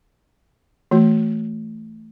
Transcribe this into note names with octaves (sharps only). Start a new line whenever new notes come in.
E3 A3 F#4